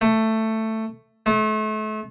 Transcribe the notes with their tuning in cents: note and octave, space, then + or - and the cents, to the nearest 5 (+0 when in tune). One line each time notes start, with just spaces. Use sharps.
A3 +10
A3 -35